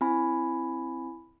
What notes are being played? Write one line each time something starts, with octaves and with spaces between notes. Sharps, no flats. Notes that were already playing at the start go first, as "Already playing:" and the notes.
C4 E4 G#5 B5